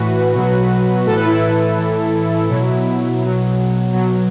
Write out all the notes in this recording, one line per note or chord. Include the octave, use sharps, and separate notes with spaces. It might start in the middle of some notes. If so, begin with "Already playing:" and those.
Already playing: A2 E3 F#4 B4
B2 F#3
A2 E3 A4
B4
E4 A4
A2 E3
B2 F#3 E4
E4
B2 F#3
B2 F#3